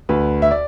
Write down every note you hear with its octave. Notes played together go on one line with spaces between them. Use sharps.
D2 B4
E5
D5